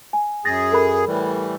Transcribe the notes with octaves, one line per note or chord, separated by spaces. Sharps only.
G#5
F#2 G#4 A6 A#6
A4 A#4 B5
A2 E3 G3